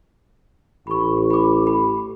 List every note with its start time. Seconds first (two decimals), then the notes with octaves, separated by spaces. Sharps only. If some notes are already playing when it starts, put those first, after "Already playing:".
0.87 A1 B5 C#6
1.30 B5 D6
1.65 A4 B5